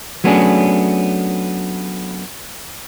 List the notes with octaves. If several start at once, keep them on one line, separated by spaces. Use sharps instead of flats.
F#3 A3 B3 C#4 D4 G#4